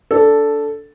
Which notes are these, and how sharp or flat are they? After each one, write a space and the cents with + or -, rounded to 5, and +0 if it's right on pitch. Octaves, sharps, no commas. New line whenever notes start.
D4 -15 A4 +0